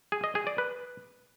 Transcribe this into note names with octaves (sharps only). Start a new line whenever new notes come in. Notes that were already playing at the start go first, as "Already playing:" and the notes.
G#4
D#5
G#4
D5
B4